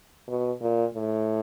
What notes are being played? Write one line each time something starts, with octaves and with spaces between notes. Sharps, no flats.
B2
A#2
A2